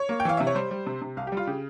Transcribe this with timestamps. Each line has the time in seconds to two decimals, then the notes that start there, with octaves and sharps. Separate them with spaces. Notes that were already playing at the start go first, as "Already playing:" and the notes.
Already playing: C#5
0.09 A#3
0.20 G5
0.25 E3 F5
0.37 C3 E5
0.47 C#5
0.55 G3 C5
0.71 G3
0.87 C3
1.02 C3
1.17 C2 F5
1.27 G4
1.32 G3 F4
1.47 C#3 G4